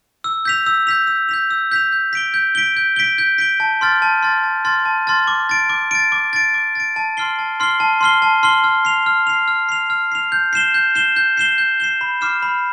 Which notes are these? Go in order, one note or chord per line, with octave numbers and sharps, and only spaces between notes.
E6
G6 B6 F7
E6
G6 B6 F7
E6
G6 B6 F7
E6
G6 B6 F7
G6
B6 D7 G7
G6
B6 D7 G7
G6
B6 D7 G7
G6
B6 D7 G7
A5
C6 F6 A6
A5
C6 F6 A6
A5
C6 F6 A6
A5
C6 F6 A6
D6
A6 D7
D6
A6 D7
D6
A6 D7
D6
A6 D7
A5
C6 F6 C7 G7
A5
C6 F6 C7 G7
A5
C6 F6 C7 G7
A5
C6 F6 C7 G7
F6
C7 F7
F6
C7 F7
F6
C7 F7
F6
C7 F7
G6
C7 E7 G7
G6
C7 E7 G7
G6
C7 E7 G7
G6
C7 E7 G7
B5
D6 F6 C7 E7
B5